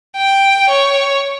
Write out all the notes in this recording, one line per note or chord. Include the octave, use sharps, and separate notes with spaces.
G5
C#5